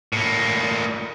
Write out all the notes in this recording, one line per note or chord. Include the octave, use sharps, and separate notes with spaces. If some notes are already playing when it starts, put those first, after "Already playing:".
A2 A#3